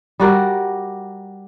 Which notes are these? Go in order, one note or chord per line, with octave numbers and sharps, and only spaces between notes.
G3 F#4 A#4